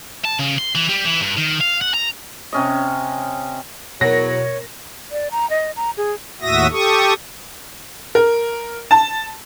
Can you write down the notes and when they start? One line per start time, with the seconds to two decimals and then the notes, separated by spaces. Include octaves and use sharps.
0.25 A5
0.39 C#3
0.58 C6
0.75 E3
0.89 G3
1.05 E3
1.21 G2
1.37 D#3
1.60 F5
1.81 F#5
1.94 A#5
2.53 C3 C#4 D#5
4.01 E2 B2 F#3 A#4 C#5 A#6
5.12 D5
5.31 A#5
5.50 D#5
5.76 A#5
5.97 G#4
6.42 D#2 A2 F#4 E5 D#6 A#6
6.71 G4 A4 C#6 D#6
8.15 A#4
8.91 A5